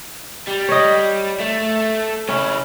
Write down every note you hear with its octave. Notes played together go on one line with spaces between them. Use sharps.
G3
C#5 D#5
A3
C#3 C#4 E4